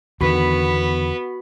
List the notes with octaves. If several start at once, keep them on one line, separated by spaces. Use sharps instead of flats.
E2 D3 D#3 B3 F#4 B5 B6